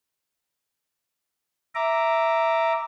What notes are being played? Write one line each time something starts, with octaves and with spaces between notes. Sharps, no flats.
E5 A#5 D6